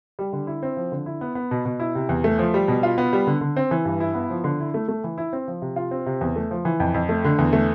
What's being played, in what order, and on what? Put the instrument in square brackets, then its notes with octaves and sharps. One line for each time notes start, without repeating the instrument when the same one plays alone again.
[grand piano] G3
D3
E4
C4
F3
D3
E4
B3
B3
B2
B2
E4
C3
E2
A3
F3
G3
B2
F4
B3
G3
D3
D3
C4
E3
G2
E4
B3
F3
D3
E4
A3
A3
E3
E4
C4
F3
C3
F4
C4
C3
E2
A3
F3
E3
F2
F2
A3
D3
E2
A3